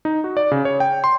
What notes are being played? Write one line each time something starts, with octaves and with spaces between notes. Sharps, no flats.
D#4
F#4
D5
C#3
C#5
G5
C6